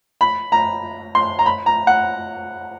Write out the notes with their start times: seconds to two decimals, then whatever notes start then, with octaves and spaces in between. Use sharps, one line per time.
0.21 B5
0.52 A#5
1.15 C6
1.39 A#5
1.46 B5
1.66 A#5
1.87 F#5